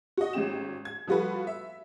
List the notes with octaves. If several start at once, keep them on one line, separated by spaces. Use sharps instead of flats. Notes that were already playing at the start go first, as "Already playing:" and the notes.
F#4 D#5
G#1 G#3 C#4 G4 E7
G#6
F3 G3 F4 F#4 A4 B4
E5